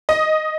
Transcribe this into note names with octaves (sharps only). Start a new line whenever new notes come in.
D#5